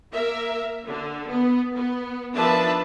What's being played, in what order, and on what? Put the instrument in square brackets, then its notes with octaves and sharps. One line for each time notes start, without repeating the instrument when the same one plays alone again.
[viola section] A#3 A#4 E5
D3
B3
B3
D#3 F3 D4 B4 E5 A5